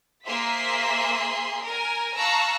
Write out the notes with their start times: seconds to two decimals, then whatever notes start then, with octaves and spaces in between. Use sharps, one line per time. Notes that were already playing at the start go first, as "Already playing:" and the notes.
0.26 A#3 G#4 C5 E5 C6 B6
1.66 A#4 G#5
2.17 F5 A5 A#5 C#6 E6 F#6